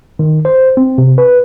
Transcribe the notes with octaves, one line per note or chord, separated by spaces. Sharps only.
D#3
C5
C4
C3
B4